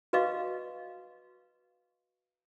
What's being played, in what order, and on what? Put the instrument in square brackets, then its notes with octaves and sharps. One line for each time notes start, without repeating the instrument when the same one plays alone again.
[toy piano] F#4 B4 D#5 F5 C#6 D6